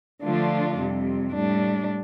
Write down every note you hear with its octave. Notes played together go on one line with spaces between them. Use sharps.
D3 F3 A3 D4 F4
F2 C3 G3
A2 G3 D4